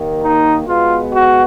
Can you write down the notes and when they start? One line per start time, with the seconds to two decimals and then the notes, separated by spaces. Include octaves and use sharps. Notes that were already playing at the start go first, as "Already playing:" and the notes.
Already playing: D#2 D#3 A#3
0.22 D#4
0.67 B2 G#3 B3 F4
1.12 F#4